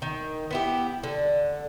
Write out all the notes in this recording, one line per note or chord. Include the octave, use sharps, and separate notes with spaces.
D#3
B3 E4 G4
D3